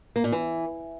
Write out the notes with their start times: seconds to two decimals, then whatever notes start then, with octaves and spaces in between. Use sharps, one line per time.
0.16 A#3
0.24 A#2
0.32 E3